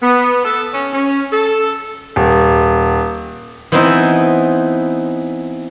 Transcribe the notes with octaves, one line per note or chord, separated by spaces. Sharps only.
B3
A4
C#4
C#4
A4
D#1
E3 B3 C4 D#4 E4